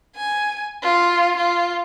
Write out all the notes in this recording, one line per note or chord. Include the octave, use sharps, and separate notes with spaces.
G#5
F4
F4